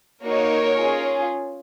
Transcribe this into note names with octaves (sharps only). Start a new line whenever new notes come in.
A#3 D#4 F#4 A#4 C#5
C#4 F4 G#4